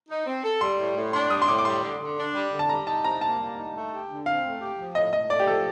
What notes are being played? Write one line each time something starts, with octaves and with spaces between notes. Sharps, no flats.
D#4
C4
A4
G3 C6
A2
A2
D4 C6
G3 D#6
C6
A2 D6
D6
G3 C6
D3
D3
D4
G3
D3
A5
G3 A#5
D#4 A5
C3 A#5
A#3 A5
G3
D#4
A3
G4
D3
C4 F5
A3
G4
F3
A2 D#5
A2 D#5
A3 D5
G4
F3 A4